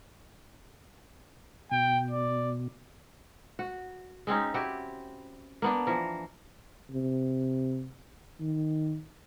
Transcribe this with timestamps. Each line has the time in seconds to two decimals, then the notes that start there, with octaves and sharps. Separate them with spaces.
1.71 B2 G5
2.11 D5
3.59 F#4
4.27 G#3 C4 C#4 D#4
4.54 E4 F#4 G4
5.62 A#3 B3 D4
5.87 E3 F3 A#4
6.91 C3
8.40 D#3